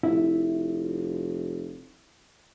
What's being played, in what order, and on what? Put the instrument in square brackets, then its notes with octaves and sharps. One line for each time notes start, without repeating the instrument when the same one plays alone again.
[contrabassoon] F1 [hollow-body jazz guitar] E4 E5